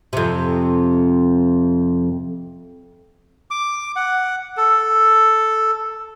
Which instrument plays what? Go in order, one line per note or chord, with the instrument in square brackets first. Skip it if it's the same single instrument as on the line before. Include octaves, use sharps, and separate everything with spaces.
[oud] F2 C3
[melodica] D6
F#5
A4